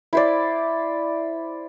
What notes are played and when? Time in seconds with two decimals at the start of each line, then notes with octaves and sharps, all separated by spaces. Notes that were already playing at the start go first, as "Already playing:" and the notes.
0.13 E4 C5 D5